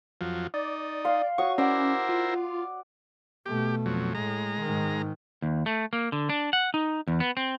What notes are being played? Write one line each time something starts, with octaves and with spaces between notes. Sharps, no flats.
F2 F3 F#3
D#4 D5
F5 C6
F#4 C#5 C#6 D#6
C#4 E4 A#4 C5 D5 F#5
F4
B2 A3 G4
F2 F#3
A2 G#3 A#5
G#2 D#3
D#2
A3
A#3
D3
D4
F#5
D#4
E2
B3
C4